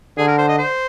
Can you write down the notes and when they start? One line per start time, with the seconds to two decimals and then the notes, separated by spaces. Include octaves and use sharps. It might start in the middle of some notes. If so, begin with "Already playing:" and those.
0.18 D3 G#4
0.27 A#4
0.38 C5
0.48 D#5
0.59 C5